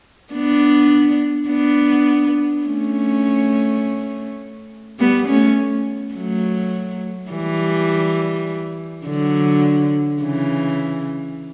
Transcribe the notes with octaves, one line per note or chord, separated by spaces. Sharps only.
B3 D4
B3 D4
A3 C#4
G3 B3
A3 C#4
F#3 A3
E3 G3
D3 F#3
C#3 E3